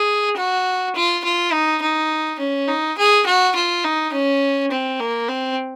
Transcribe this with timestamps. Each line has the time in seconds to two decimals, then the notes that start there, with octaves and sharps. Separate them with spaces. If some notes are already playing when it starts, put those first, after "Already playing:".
Already playing: G#4
0.36 F#4
0.95 F4
1.24 F4
1.52 D#4
1.82 D#4
2.39 C#4
2.68 D#4
2.98 G#4
3.26 F#4
3.55 F4
3.85 D#4
4.13 C#4
4.71 C4
5.00 A#3
5.28 C4